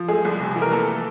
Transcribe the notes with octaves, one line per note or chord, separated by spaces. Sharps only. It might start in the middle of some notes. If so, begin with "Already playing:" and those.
Already playing: F3
G#3 A3 G#4
C2
C3
E3
A#4
A3 A#3 A4